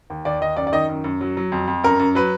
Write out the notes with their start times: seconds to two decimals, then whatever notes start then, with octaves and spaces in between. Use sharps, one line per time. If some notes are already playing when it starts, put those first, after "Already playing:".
0.10 D#2
0.25 D#2 D5
0.41 D#2 D#5
0.56 F#2 D5
0.67 D5
0.72 D#3 D#5
0.89 F#2
1.04 F#2
1.21 F#3
1.37 F#3
1.52 F2
1.68 F2
1.84 F#2 A#4
2.00 F#2
2.15 F#3 B4